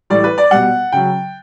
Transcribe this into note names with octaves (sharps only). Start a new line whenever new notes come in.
A2 E3 G3 D5
B4
D5
B2 G3 F#5
C#3 F#3 G5